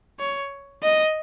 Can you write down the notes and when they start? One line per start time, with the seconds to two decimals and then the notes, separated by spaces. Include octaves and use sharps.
0.19 C#5
0.83 D#5